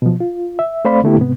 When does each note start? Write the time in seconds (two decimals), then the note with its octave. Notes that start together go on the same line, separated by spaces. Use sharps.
0.02 B2 F3
0.20 F4
0.59 E5
0.85 A3 C4 C5 D5 F5 B5
1.04 D3 A3 B3 E4 G4
1.18 G#2 C3 B3